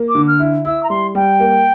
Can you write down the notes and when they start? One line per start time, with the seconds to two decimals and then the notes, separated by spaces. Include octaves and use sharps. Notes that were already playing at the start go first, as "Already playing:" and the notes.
Already playing: A#3
0.08 D6
0.15 D3
0.27 F6
0.39 E4
0.65 E4 E6
0.83 A#5
0.89 G3 C6
1.15 G3 G5
1.40 A#3